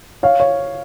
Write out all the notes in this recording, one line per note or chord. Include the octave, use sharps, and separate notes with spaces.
C#5 F5
C#5